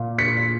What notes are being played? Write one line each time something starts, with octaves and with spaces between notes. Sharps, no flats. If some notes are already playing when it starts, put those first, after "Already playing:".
Already playing: A#2 A#3
B6 C#7